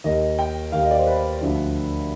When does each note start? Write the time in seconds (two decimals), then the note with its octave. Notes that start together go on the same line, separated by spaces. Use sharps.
0.04 D#2 D#3 D#5
0.39 G5
0.72 D#2 D#3 F5
0.83 D#5
0.91 D5
0.99 C5
1.07 B4
1.41 D2 D3 F3